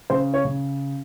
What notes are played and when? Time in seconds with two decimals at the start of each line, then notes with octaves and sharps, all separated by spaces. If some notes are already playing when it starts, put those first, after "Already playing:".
0.10 C#3 C5
0.34 C#5
0.45 C#3